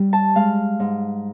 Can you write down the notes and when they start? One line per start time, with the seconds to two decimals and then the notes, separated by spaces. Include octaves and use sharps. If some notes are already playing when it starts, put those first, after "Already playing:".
Already playing: G3
0.13 A5
0.35 G#3 F5
0.80 G#2